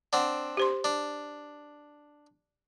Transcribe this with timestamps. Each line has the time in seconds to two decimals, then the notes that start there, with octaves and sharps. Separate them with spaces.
0.13 C4 D4 F#5
0.57 G4 C5 C6
0.84 D4